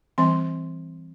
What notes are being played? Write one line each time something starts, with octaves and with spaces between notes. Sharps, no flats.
E3 G3 C4 C6